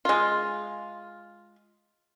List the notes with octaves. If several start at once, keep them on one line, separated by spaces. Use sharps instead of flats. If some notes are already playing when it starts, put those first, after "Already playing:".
G#3 F4